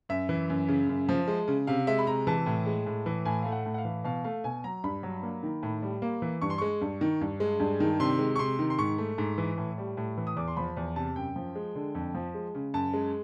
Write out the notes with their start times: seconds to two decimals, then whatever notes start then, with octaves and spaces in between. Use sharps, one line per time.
0.09 F#2 E5
0.29 E3
0.50 F#2
0.68 C#3
0.89 F#2
1.09 F3
1.28 G#3
1.48 C#3
1.67 C3 F5
1.87 G#3 E5
1.99 B5
2.07 C3 A#5
2.27 E3 A5
2.46 A2
2.66 G#3
2.86 A2
3.06 E3
3.25 A2 G#5
3.42 A3 F5
3.52 F#5
3.66 A2
3.74 F#5
3.78 F5
3.85 E3
4.04 B2 F5
4.24 A3 F5
4.44 B2 G#5
4.64 F#3 A#5
4.84 G2 B5
5.03 F#3
5.23 A#3
5.43 D#3
5.63 A2
5.82 G3
6.02 A#3
6.22 E3
6.42 G2 C#6
6.50 C6
6.58 G#3 C#6
6.81 G2
7.01 D#3
7.21 G2
7.40 G#3
7.60 G2
7.80 D#3
8.00 C3 C6
8.19 G#3
8.36 C#6
8.39 C3 C6
8.59 D#3
8.70 C6
8.78 G#2 C#6
8.98 A3
9.18 G#2
9.38 E3
9.58 A2
9.78 G3
9.97 A2
10.18 E3
10.27 D#6
10.37 E2 D6
10.48 C6
10.57 F3 B5
10.77 E2
10.96 C3 A5
11.16 F#2 G5
11.36 F3
11.55 G#3
11.75 D3
11.95 F2
12.15 F3
12.34 G#3
12.55 C#3
12.74 F#2 A5
12.93 G#3